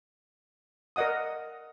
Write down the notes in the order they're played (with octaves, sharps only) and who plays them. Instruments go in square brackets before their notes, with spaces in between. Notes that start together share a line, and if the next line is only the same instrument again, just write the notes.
[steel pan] A#4 D5 D#5 F#5 D#6